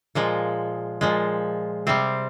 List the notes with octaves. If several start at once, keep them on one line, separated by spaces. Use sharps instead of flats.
A#2 F3 G#3
A#2 F3 G#3
C3 G3 C4